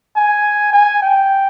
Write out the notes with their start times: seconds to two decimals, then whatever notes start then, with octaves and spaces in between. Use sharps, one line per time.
0.16 G#5
0.73 G#5
1.02 G5